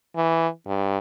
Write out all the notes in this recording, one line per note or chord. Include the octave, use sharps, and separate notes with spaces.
E3
G2